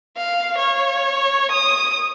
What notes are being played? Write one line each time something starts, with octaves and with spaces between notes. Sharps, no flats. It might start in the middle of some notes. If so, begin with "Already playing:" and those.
F5
C#5
D#6